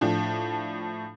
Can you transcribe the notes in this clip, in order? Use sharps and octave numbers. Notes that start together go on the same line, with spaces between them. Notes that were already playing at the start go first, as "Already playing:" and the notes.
A2 F3 D4